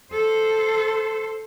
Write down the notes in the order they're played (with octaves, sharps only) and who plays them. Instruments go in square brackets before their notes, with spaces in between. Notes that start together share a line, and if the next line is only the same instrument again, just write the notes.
[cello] A4 C5